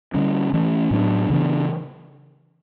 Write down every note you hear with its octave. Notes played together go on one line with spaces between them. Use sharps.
D3 G3 C#4
E3 A3 C#4
A2 F#3 B3 D4
C#3 E3 B3 D4